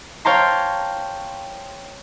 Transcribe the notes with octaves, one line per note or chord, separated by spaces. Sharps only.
C#5 F5 G5 A5 A#5 C6